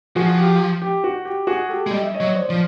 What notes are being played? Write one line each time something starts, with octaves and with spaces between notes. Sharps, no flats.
F3 F#4 G#4
G4
G4
F#4
G4
F#4 G#4
G4 A4
G#3
G3 D#5
E5
C#5 D#5
F#3
C5 D5
F3